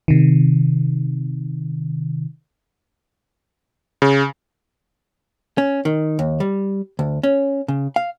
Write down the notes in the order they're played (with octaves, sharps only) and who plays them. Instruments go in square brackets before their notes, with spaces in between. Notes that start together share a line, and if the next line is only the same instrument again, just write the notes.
[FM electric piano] C3 D#3
[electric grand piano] C#3
[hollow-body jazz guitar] C#4
D#3
D#2
G3
D2
C#4
C#3
F5